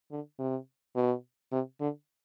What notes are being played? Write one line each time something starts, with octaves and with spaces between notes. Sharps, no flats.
D3
C3
B2
C3
D3